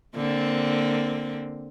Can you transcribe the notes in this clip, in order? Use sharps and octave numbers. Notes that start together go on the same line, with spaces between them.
D3 A#3 C4